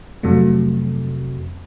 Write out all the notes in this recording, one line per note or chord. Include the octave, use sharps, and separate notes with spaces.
F2 C3 F#3 A3